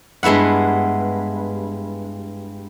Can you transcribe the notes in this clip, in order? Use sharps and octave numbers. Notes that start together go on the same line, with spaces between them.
G2 G#3 B3 E4 F#5